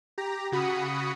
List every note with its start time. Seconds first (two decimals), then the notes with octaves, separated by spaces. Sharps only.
0.18 G4 A#5
0.52 C#3 F#4 B5 D#6 C#7